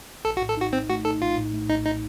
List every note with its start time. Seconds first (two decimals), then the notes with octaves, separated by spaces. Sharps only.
0.25 A#1 A4
0.37 F#4
0.41 A2
0.49 A4
0.57 D#4 F#4
0.73 C4 D#4
0.89 A3 F#4
1.05 D#4 A4
1.22 A#1 F4
1.37 A2
1.54 A3
1.69 A#1 D#4
1.86 D#4